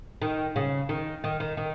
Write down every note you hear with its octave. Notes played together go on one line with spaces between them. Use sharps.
D#3
C#3
D#3
D#3
D#3
D#3